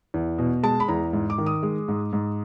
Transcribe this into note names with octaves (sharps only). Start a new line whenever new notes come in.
E2
B2
G#3 A5
B5
E2 A#5
G#2
D6
D#3
D#6
G#3
G#2
G#2